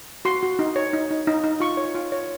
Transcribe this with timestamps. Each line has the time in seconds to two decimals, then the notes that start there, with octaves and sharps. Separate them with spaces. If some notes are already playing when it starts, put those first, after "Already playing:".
0.25 F#4 C6
0.43 F#4
0.59 D#4
0.76 C#5
0.93 D#4
1.11 D#4
1.27 D#4
1.44 D#4
1.60 F4 C#6
1.77 C#5
1.95 F4
2.12 C#5